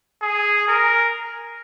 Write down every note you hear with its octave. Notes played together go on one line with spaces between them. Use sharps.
G#4
A#4